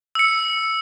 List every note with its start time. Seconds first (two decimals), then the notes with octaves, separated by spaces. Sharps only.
0.15 E6 C#7